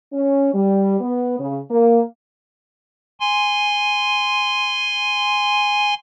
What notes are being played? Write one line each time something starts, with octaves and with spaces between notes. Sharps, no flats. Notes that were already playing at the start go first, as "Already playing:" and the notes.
C#4
G3
B3
C#3
A#3
G#5 C6